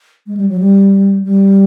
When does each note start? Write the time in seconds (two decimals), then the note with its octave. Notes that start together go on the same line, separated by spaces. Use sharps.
0.27 G#3
0.37 G3
0.49 F#3
0.60 G3
1.25 G3